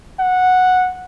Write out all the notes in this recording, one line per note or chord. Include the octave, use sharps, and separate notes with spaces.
F#5